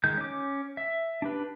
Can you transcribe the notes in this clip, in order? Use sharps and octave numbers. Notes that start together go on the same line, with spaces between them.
D#3 G#3 G6
C#4 D6
E5
D4 G4 B4